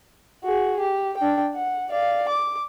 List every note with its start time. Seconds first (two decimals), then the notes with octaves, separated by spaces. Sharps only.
0.44 F#4 G#4
0.79 G4
1.17 D4 G5
1.54 F#5
1.90 D5 F5
2.29 D6